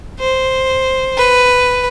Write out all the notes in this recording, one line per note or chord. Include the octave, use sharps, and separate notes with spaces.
C5
B4